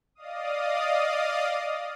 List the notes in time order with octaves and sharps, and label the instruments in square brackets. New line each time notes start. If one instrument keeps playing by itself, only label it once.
[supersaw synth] D5 D#5 F5 D#6